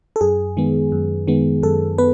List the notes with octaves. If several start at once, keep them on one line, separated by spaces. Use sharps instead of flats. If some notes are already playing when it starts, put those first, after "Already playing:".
A4
F#2 G#4
D#3 G#3 B3
F#2
D#3 G#3 B3
F#2 A4
B3 B4